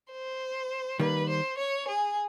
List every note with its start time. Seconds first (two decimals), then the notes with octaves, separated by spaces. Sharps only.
0.12 C5
0.99 D#3 G3 A#3 B4
1.28 C5
1.57 C#5
1.87 G#4